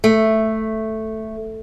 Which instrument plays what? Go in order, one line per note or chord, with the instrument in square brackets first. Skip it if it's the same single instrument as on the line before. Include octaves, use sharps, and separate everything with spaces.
[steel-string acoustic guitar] A3